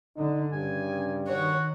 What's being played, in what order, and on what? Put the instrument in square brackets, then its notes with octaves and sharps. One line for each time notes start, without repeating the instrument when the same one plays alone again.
[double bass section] D3 [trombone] D#4
[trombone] G2 [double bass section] C#3 [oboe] G#5
[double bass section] D#3 [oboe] F#4 [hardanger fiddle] C#5